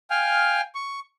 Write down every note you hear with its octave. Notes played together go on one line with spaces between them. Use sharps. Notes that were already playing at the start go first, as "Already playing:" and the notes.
F5 G5 G#5 F6
C#6